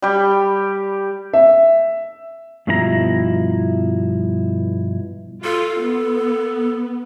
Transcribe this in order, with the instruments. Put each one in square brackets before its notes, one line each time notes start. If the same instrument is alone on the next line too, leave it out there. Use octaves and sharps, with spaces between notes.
[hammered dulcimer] G3 G4
[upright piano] E5
[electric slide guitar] G2 B2 F3 E4 F#4 A#5
[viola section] F4 [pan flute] A4
[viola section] B3